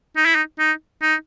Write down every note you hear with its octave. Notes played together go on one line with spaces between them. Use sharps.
D#4
E4
D#4
D#4
D#4